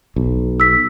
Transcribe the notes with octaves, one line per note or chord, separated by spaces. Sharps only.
B1
E6 B6